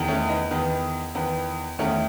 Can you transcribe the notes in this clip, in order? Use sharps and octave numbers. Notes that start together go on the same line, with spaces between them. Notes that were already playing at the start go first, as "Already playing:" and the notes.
Already playing: E2 D#3
A3 C#4
B3 D#4
E2 D#3 B3
E2 D#3 B3
E2 D#3 A3 C#4